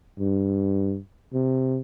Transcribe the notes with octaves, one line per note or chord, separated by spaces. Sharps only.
G2
C3